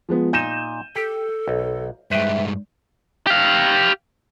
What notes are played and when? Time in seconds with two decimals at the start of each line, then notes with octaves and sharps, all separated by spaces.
0.09 F3 G#3 B3
0.33 A#2 D#4 G6 D#7 E7
0.96 G4 A4
1.48 B1
2.11 G2 G#3 B4 C5 E5 G5
3.27 G4 F5